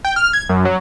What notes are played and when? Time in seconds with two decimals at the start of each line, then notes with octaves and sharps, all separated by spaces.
0.05 G5
0.16 F6
0.33 G#6
0.49 F#2
0.65 F#3